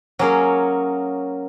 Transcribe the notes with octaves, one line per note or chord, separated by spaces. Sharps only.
F#3 A#3 C#4 G#4 C#5